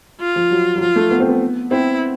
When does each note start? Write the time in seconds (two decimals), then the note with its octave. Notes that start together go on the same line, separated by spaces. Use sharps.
0.21 F4
0.36 F3
0.51 F#3
0.76 F#3
0.81 F3 F4
0.96 A3
1.11 B3
1.20 C4
1.29 B3
1.71 C4 E4